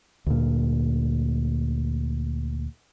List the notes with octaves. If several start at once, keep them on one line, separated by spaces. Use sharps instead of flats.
D2 A#2